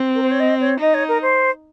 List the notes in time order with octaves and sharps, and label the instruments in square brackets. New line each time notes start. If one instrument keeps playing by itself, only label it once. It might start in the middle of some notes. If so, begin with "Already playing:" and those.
Already playing: [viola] C4
[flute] A#4
C5
C#5
D#5
C#5
[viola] D#4 [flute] D#5
[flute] C#5
A#4
C5